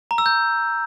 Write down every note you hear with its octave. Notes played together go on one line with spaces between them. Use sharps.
A#5
E6
G6